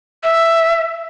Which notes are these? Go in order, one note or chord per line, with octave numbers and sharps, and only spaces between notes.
E5